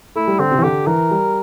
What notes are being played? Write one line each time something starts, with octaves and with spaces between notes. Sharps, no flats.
A3 E4
G3
D3 C4
C3
E3
D3 G4
E3 A#4
G3